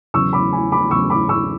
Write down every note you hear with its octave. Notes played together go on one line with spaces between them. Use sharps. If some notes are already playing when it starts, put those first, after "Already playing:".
E2 C#3 F#3 C#6 E6
B5 D6
G#5 B5
B5 D6
E2 C#3 F#3 C#6 E6
B5 D6
C#6 E6